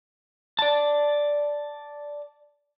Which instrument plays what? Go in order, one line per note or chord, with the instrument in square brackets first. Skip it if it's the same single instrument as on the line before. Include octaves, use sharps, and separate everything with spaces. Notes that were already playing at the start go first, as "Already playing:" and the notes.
[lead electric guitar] D5 A5